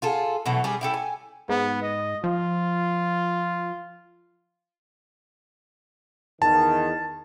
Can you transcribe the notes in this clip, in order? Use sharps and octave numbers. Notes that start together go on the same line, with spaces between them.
F4 G#4 A4
B2 E3 F#3 A3
G3 D4 G#4
E4 G4 A4
G#5
G#2 B3
D#5
F3 F4
E2 D#3 A5